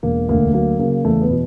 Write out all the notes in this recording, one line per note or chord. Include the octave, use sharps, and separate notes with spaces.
E1 A#3
D2 A#3
F#3 A#3
C#3 A#3
E2 A3
B3
B2